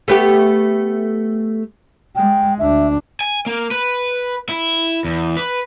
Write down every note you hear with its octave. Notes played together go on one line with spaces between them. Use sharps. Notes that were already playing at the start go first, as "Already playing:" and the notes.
A3 B3 G4
G#3 G5
D2 D4 E5
G#5
A#3
B4
E4
E2
B4